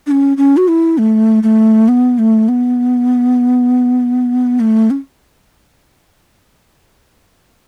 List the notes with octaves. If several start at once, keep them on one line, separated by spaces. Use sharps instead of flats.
D4
C#4
C#4
F#4
E4
A3
A3
B3
A3
B3
A3
C#4